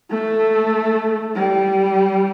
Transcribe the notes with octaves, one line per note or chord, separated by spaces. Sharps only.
A3
G3